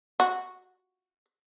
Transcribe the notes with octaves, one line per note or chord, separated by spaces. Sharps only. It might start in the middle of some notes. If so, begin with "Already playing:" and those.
F#4